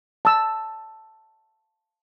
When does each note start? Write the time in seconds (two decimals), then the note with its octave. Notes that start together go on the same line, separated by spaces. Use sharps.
0.25 A5 E6